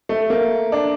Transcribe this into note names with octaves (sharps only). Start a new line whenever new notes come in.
A3
A#3
D4